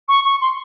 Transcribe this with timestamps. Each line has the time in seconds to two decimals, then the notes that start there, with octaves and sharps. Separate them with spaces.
0.08 C#6
0.24 C#6
0.40 C6